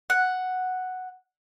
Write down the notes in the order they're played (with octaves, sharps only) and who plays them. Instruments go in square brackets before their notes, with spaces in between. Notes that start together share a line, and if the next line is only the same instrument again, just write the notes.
[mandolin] F#5